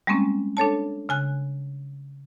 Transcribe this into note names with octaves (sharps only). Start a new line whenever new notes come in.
G3 G#3 A#3 C4 C#4
D4 A4 C#5 A5
C#3 G#5 F#6